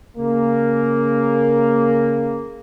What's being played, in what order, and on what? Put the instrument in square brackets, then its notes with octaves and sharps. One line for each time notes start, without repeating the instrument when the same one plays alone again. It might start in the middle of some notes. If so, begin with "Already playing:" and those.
[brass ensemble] C#3 A#3